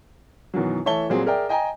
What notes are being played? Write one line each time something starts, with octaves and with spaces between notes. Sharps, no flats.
F#2 B2 D#3 E3 F#3
E3 A3 C#5 E5 A5 G7
A#2 F#3 G3 C4 G#4
G#4 A#4 D5 E5 G5
D#5 G5 G#5 A#5